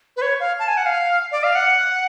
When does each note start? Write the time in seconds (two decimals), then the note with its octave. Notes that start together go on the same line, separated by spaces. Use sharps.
0.17 B4
0.22 C#5
0.40 F5
0.59 A5
0.68 G#5
0.77 F#5
0.86 F5
1.32 D5
1.44 F5
1.55 F#5